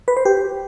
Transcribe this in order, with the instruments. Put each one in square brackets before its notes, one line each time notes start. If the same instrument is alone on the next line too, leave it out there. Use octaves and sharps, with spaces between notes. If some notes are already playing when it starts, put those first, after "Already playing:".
[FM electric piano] B4
C5
G4